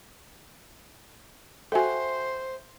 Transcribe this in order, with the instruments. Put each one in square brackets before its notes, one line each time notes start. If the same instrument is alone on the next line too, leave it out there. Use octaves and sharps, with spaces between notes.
[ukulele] F#4 E5 G5 [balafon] A4 G#5 [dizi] C5